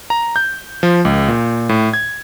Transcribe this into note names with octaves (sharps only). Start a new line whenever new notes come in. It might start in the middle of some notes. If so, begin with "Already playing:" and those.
A#5
G6
F3
C#2
A#2
A2
G#6